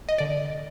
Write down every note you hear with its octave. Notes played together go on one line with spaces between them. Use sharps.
D#5
D3 D5